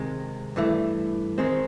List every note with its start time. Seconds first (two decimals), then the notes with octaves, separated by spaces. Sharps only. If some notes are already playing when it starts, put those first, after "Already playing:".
Already playing: C3 D#3 G#3
0.56 G2 E3 A3
1.38 D#3 G#3 C4